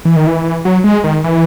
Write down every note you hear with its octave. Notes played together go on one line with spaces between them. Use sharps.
E3
D#3
E3
F#3
G#3
D#3
E3